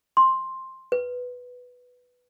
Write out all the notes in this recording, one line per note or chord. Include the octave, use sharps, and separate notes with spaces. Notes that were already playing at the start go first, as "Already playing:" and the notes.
C6
B4